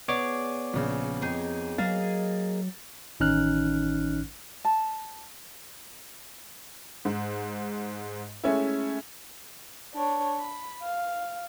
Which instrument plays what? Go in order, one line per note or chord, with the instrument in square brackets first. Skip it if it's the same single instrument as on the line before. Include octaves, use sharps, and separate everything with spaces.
[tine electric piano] B3 C#5 D6 [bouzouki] G#4 D5
[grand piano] A#1 C#3
[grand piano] F2 [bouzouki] D#4 G#4
[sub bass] F#3 [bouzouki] A#3 G#4 D#5 [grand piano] A6
[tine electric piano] A1 D#3 C#4 D#4 F6 F#6
[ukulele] A5
[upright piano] G#2
G#3 A3 C#4 E4
[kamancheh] D4 C#5
B5
F5